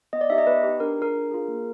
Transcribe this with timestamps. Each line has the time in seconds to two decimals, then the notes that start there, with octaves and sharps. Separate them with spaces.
0.13 B3 D#5
0.21 D5
0.30 D#4 G4 E5
0.38 D#5
0.47 B3 B4
0.64 D#4 G4
0.80 D4 A#4
0.98 F4 G#4 A#4
1.15 D4
1.31 F4 G#4
1.48 A#3